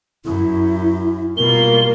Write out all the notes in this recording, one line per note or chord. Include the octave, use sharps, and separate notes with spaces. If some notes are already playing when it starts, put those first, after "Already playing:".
F#2 E4
B2 G3 A#3 F4 A#4 G7